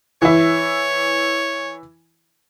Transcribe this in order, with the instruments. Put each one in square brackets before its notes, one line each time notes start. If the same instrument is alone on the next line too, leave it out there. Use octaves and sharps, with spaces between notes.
[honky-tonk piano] E3 E4 [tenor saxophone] C#5